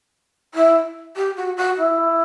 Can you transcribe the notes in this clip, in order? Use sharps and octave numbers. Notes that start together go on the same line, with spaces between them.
E4
G4
F#4
F#4
E4